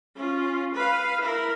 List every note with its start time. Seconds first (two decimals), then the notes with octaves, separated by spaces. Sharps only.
0.16 C#4 F4
0.74 B4 F5
1.21 E4 A#4